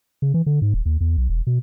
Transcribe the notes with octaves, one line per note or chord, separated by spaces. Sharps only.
C#3
E3
D3
G#2
D#1
D#2
E2
B1
E1
B2